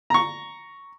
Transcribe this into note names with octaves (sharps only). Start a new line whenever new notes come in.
A#5 C#6